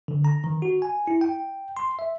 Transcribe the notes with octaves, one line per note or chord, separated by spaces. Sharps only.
D3
A#5
D#3
F#4
G#5
E4
G5
C6
E5